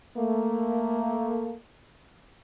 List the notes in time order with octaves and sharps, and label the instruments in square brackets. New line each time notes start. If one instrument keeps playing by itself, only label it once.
[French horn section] A3 A#3